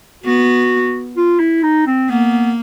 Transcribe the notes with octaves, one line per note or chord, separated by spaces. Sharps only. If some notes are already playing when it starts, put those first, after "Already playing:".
B3 F#4
F4
E4
D#4
C4
A#3 B3